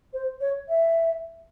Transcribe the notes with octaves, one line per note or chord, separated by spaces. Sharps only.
C5
C#5
E5